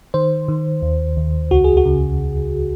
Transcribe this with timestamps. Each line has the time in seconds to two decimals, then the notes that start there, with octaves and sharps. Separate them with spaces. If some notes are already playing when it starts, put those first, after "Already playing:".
0.14 D#3 C5
0.48 D#3
0.82 D#2
1.17 D#2
1.51 C#2 F#4
1.64 G#4
1.77 F#4
1.85 C#3